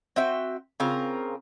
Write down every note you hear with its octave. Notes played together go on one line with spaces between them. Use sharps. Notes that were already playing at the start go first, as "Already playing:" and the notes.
C4 F#4 E5 G5
C#3 C4 F4 A#4